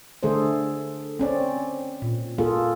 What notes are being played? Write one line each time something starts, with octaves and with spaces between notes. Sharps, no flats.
D3 A3 G#4 A4 C5
C4 C#4 D5
A#2
A#3 F4 G#4 A4